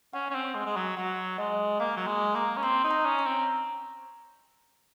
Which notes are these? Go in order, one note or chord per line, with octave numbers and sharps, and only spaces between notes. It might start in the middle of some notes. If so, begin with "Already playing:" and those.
C#4 F#5
C#4
C4
G#3
G#3
F#3
F#3 F#5
G#3 D#5
A#3 F5
F#3
G#3
A#3 A#5
C#4
C4 C6
D#4
A#5
C#4
A#5
C4